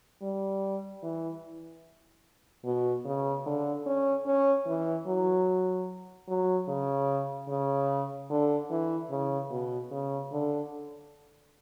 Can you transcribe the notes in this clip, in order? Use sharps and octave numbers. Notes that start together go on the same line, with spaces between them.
G3
E3
B2
C#3
D3
C#4
C#4
E3
F#3
F#3
C#3
C#3
D3
E3
C#3
B2
C#3
D3